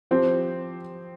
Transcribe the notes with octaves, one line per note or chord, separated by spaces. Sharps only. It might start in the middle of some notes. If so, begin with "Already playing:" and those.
F3 C4 G4 C5